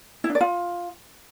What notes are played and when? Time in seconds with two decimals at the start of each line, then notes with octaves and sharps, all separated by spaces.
0.24 E4
0.29 D4
0.35 D5
0.41 F4